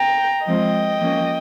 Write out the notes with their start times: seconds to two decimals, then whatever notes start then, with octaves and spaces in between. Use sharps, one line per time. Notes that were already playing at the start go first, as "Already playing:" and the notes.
Already playing: G5 A#5
0.45 F3 G#3 C4 D#5 G5
0.99 F3 A#3 C#4